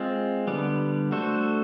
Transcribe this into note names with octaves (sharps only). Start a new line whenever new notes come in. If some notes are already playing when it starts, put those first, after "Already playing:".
Already playing: G#3 C4 F4
D3 G3 B3
A3 D4 F#4 A4 C5